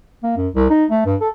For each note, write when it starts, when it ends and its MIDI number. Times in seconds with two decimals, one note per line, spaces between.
0.23 0.33 58
0.37 0.48 42
0.54 0.65 36
0.70 0.85 63
0.90 1.01 57
1.05 1.15 43
1.21 1.29 69